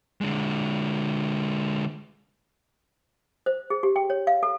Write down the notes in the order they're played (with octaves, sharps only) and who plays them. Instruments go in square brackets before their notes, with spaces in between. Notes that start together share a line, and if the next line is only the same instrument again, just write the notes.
[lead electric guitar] D3 G#3
[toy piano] C5
G#4
G4
G5
C#5
F5
A4